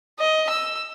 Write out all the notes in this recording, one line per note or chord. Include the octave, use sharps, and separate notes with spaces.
D#5
E6